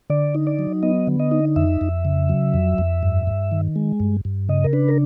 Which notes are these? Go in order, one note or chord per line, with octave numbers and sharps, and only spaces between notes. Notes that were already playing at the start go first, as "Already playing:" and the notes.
D3 D5
D#4
D5
F#3
B3 D#5
D3
D#5
D#4
F2 E5
F2
C#3
F#3
F2
F2
G2
G2
D#3
G#3
G2
G2
C#3 D#5
A#4
D4 B4
A#4